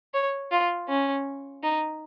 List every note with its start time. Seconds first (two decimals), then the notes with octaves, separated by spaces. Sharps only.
0.14 C#5
0.51 F4
0.88 C#4
1.63 D#4